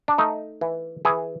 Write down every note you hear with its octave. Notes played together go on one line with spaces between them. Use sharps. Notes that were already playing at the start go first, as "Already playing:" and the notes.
D4
A3 D#4
E3
E3 G#4